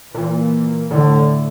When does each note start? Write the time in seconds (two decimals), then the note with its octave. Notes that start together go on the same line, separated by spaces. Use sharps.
0.13 A#2 E3
0.91 A2 D3